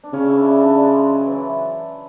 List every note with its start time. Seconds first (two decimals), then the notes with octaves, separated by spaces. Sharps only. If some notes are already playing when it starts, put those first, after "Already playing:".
0.04 D4
0.13 C#3 C#4
0.29 E4
0.37 D4
0.60 D4
0.84 G#3
1.18 F#3
1.26 E3